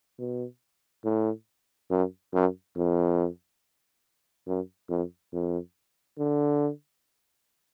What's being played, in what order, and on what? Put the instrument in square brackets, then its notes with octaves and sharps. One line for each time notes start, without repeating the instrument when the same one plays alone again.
[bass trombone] B2
A2
F#2
F#2
F2
F#2
F2
F2
D3